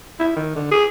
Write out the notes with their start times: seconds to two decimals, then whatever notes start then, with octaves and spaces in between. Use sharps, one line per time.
0.20 E4
0.36 D#3
0.56 D3
0.71 G#4